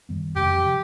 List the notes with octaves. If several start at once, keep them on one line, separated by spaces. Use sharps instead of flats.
F#2 D#3 G3 B3
F2 C3 F3 G4
C3 F3